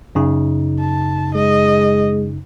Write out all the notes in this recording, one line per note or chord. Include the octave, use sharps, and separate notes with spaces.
F#2 C#3 D#4
A5
G#3 D#5